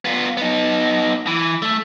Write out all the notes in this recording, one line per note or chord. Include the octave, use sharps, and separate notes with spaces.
B3 F4
B3 D#4
E3
A3